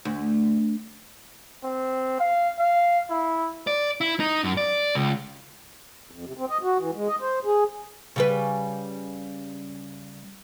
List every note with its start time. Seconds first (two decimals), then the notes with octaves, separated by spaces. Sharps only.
0.05 D2
1.65 C4
2.20 F5
2.60 F5
3.10 E4
3.67 D5
4.01 E4
4.20 D#4
4.44 F#2
4.57 D5
4.95 C#2
6.11 F2
6.25 C3
6.38 C4
6.50 D#5
6.63 F#4
6.78 E3
6.95 G#3
7.08 D#5
7.20 C5
7.45 G#4
8.16 C#3 G3 B4